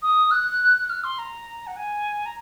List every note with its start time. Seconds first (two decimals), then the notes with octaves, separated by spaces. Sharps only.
0.02 D#6
0.31 F#6
0.89 F6
1.04 C6
1.19 A#5
1.67 F#5
1.76 G#5
2.26 A#5